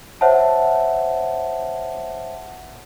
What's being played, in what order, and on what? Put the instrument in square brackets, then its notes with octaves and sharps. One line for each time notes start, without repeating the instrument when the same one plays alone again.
[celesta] C5 C#5 E5 F#5 A5